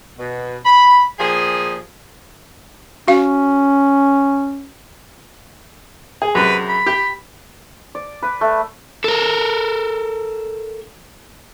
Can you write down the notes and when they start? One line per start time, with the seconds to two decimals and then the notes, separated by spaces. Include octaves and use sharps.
0.18 B2
0.65 B5
1.18 A#2 F3 G4 G#4
3.08 C#4 F#4 F5
6.22 G#4
6.35 F#2 C3 G#3 B4
6.68 B5
6.86 G4 G5
7.95 D5
8.23 B4
8.41 A3
9.04 A4 A#4